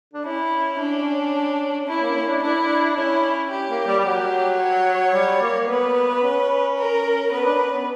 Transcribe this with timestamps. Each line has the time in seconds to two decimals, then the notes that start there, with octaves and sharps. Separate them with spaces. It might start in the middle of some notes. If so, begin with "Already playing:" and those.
0.13 D4
0.25 C#4 E4
0.79 D4
1.88 C#4 E4
2.02 A#3
2.15 C#4
2.28 D4
2.42 D4 E4
2.61 D4
2.96 C#4 E4
3.51 G4
3.69 A#3
3.87 G3
3.99 G3
4.05 F#3
4.60 C#5
5.13 G3
5.41 A#3
5.68 B3 B4
6.23 C#4
6.77 A#4
7.31 B3 B4
7.45 D4
7.58 C#4
7.72 B3